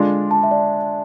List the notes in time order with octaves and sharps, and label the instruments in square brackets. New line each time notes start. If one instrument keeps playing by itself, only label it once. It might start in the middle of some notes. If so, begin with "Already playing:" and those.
Already playing: [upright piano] D3 G#3 D4 F4 [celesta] C6
[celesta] A5
E5
D5